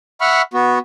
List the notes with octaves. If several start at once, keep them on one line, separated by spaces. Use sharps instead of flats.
E5 F#5 B5 C#6 F6
B3 F#4